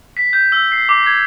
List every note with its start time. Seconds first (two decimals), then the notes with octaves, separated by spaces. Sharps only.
0.17 B6
0.33 G6
0.52 E6
0.72 C7
0.89 D6
1.06 G#6